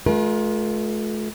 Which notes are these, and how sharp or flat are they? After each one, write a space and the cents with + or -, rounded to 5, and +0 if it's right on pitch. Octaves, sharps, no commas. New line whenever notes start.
A3 -40 F4 +20 A#4 +45